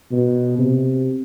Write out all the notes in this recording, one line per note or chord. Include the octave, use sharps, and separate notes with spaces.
B2
C3